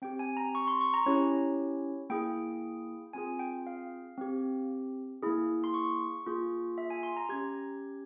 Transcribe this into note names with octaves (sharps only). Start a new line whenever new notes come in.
C4 G4 G5
G#5
A#5
C#6
C6
C#6
A#5
C#4 E4 G4 C#5
A#3 E4 G#4 G5
C4 F4 G#4 G#5
G5
F5
C4 G4
A#3 E4 G#4
C6
C#6
A#3 F4 G#4
E5
G#5
C6
A#5
C#4 G4 G#6